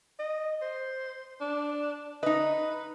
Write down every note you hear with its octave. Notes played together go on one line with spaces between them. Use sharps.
D#5
C5
D4
D#4 B4 D#5